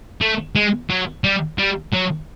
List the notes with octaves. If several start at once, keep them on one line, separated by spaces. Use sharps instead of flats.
A3
G#3
F#3
G3
G3
F#3